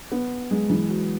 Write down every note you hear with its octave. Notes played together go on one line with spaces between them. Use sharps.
B3
G#3
E3
F#3